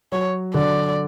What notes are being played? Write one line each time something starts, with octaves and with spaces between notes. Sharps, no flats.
F#3 C#5
D3 D5